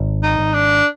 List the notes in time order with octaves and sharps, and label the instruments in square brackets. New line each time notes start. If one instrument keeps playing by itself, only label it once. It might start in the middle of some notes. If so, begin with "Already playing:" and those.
Already playing: [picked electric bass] G#1
[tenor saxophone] D#4
[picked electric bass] G#1
[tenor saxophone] D4